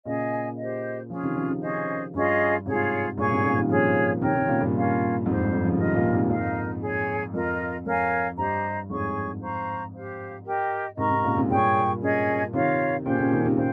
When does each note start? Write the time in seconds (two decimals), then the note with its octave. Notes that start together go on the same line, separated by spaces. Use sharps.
0.06 A#2 C#3 G#4 D#5 G#5
0.57 G4 C5 D#5
1.10 C#3 F3 C#4 F4 G#4
1.22 C3 D#3
1.36 C#3 F3
1.49 C3 D#3
1.61 C#4 G#4 C5 D#5
2.14 G2 C#4 F4 G#4 D#5
2.65 G#2 C3 F4 G#4 C#5
3.17 G2 A#2 G#4 C#5 G#5 C#6
3.30 G#2 C3
3.43 A#2 C#3
3.56 C3 D#3
3.69 C#3 F3 F4 G#4 C#5
4.21 C3 D#3 A#4 C#5 G5
4.35 C3 D#3
4.48 A#2 C#3
4.60 G2 A#2
4.74 C#4 F4 A#4 F5
5.25 F2 G#2 D#4 G4 C5
5.39 G2
5.52 F2 G#2
5.64 C#3 F3
5.77 C3 D#3 F4 A#4 D#5
5.95 A#2 C#3
6.12 G#2 C3
6.29 F2 G#2 D#4 A#4 F5
6.81 G#4 C#5 G#5
7.34 F2 F4 A#4 D#5
7.86 F2 A#4 C#5 F5 G#5
8.38 G2 G4 C5 D#5 A#5
8.89 F2 G#2 G#4 C#5 G#5 C#6
9.41 C5 F5 A#5 C#6
9.93 G4 C5 F5
10.45 G4 A#4 D#5 G5
10.97 G#2 C3 A#4 D#5 A#5 C#6
11.10 G#2 C3
11.24 A#2 C#3
11.37 G#2 C3
11.50 G2 A#2 G#4 C#5 G5 C#6
12.02 C#4 G#4 D#5 G#5
12.53 C3 D#3 F4 A#4 C#5 F5
13.05 A#2 C#3 C#4 G4 C5 G5
13.18 A#2 C#3
13.31 C3 D#3
13.45 C3 D#3
13.57 A#2 C#3 C5 G5